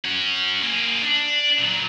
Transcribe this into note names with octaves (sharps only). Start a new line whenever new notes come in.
C#4 F#4
A#3 G#4
D4
A#2 F#3